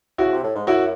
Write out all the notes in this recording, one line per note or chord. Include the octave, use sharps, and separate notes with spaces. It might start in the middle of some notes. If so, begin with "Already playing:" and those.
C#3 E4 F#4
C3
A2
G#2
F#2 E4 F#4